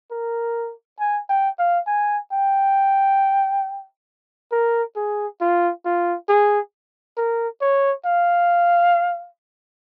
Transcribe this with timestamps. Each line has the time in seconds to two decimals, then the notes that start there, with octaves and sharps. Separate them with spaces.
0.11 A#4
0.99 G#5
1.29 G5
1.59 F5
1.87 G#5
2.32 G5
4.52 A#4
4.96 G#4
5.41 F4
5.85 F4
6.29 G#4
7.17 A#4
7.61 C#5
8.05 F5